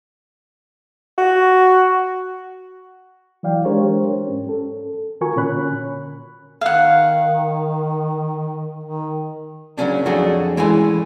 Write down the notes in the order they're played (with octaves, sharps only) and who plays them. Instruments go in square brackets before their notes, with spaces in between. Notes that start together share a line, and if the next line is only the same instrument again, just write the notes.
[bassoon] F#4
[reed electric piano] E3 F#3 D5 F5 G5
G#3 D4 G4 A#4 C5 C#5
G#2 C#4
A4
D#3 F4 F#4 A#4 G#5 C#6
A#2 D3 C#4 C#5 B5 F#6
[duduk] D#3 [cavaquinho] F5 F#5
[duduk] D#3
[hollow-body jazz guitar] C#3 F#3 A#3 C#4 D4
F2 F#3 A3 D4 F#4 G#4
E3 G#3 A3 C#4 E4 G#5